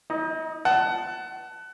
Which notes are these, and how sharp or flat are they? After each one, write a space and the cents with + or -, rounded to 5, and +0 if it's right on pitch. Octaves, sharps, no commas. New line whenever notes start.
D#4 +40 D#5 -10
F#5 +25 A5 +0